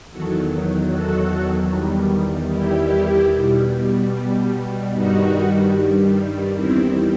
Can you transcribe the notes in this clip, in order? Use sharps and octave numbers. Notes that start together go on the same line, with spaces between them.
E2 D#3 F#3 F#4 A4
F#4 A4
E2 D#3 G3
E4 G4
B2 G3
G2 D#3 G3 D#4 F#4
E2 D#3 G3 C4 E4